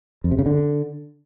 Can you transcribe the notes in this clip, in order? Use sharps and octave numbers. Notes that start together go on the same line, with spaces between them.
F2
C3
C#3
D3